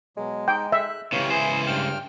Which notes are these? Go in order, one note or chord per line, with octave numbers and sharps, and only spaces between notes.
B2 F#3 G#3
D#4 G5
E5 F#6
C#2 C3 E3 C#5 F5
C#2 E4 G#4 C5 G#5
G2 G5 F6